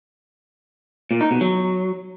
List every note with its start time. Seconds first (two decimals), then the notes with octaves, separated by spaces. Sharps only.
1.11 A#2
1.21 D#4
1.31 B2
1.41 F#3